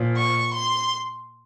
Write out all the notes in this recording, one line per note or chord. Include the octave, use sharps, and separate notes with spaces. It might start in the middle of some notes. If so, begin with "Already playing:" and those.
Already playing: A#2 F3
C#6
C6